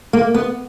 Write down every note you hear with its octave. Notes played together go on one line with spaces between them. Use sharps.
A#3
B3